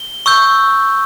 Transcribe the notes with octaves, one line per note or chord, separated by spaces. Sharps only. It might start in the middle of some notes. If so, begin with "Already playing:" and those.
Already playing: G7
C#6 E6 G6